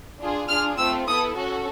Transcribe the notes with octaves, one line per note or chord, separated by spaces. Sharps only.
D4 F4 G#4
D4 F4 G#4 F6
A3 C4 F4 E6
B3 E4 A4 D#6
C#4 F#4 A4